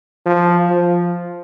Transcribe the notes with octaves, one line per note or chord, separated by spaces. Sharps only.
F3
F3